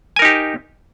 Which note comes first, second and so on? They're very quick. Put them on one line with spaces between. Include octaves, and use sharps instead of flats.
G#5 A#4 D#4 G4